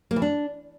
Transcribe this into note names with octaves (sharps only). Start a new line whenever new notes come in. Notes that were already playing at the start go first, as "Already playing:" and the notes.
A#3
E3
D4